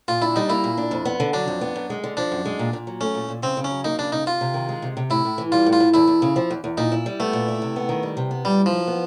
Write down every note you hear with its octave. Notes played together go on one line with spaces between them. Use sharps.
A#2 F4
D4 E4
G3 D#4
A#3 E4
A#2
D4
F2
B3
D3
F#3 D4
F2
B3
F#2
G#3
D3
F3 D4
F#2
G#3
A#2
A#2
F#3
A3 C#4
A#2
A#2
C#3 C4
C#3
C#4
F#3
A#3 D#4
C#3 D4
C#3 D#4
C3 F4
C3
D#3
G#3
C3
C3
A2 E4
A2
E3
G3 F4
A2
F4
A2
E2 E4
E2
C#3
F3
E2
E2
A#2 D#4
E4
G3
A3 B3
A#2
E4
C3
B3
D#3
G3
C3
B3
A#2 G3
E4
F3
F#3
B3